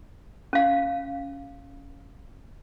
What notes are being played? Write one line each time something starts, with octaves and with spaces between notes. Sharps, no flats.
C#4 F5